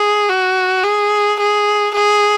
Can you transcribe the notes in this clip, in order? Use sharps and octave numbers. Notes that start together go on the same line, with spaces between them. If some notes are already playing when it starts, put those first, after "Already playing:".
Already playing: G#4
F#4
G#4
G#4
G#4